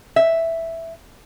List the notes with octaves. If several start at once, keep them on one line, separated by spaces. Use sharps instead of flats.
E5